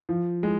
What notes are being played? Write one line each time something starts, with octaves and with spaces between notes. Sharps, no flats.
F3
G#3